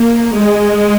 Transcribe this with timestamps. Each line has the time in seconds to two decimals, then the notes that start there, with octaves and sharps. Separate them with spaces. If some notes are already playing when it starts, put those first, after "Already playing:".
Already playing: A#3
0.36 G#3